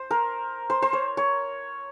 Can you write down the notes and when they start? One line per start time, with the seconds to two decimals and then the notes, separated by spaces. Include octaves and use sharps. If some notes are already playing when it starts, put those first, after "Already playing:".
Already playing: C5
0.11 A#4
0.70 C5
0.82 C5
0.93 C#5
1.17 C#5